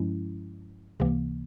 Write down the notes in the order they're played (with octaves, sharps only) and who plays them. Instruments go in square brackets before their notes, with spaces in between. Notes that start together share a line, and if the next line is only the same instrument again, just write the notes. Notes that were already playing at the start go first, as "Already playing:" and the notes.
Already playing: [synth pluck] G2 F3 G#3 C#4 E4
C#2 C3 E3 A#3